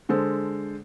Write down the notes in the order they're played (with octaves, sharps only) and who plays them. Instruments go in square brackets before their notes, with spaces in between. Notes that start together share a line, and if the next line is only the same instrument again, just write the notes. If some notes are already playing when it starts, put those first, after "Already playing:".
[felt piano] D3 G#3 A4 C5